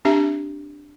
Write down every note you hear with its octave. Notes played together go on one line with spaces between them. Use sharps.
C4 D4 G4 E5 A5